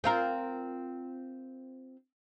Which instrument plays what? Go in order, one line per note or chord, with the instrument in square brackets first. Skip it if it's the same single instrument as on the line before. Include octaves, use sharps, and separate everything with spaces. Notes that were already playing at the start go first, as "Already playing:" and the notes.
[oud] C4 F4 A#4